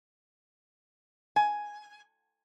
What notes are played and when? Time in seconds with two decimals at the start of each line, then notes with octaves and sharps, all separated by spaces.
1.36 G#5